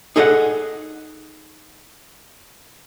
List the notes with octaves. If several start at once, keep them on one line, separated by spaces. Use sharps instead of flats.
D#4 G#4 A4 D#5 E5 F#5